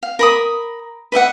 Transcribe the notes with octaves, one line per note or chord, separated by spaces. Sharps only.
F5
A#4 B5 D#6
B4 D#5 E5 F#5